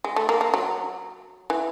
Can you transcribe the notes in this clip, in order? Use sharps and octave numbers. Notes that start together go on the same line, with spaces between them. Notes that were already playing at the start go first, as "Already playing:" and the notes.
G#3
A3
A#3
A#3
F#3
E3